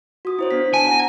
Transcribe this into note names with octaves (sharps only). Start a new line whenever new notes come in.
F#4 D#6
E4 C5 C#5
B3 D4 B6
G#5 A5
F#5 A#5 A#6